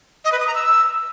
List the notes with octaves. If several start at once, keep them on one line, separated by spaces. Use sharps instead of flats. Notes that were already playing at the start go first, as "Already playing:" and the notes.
D#5
B4
D#6
A#5
E6